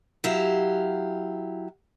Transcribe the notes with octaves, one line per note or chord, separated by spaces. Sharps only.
F#3 E4 G4 F5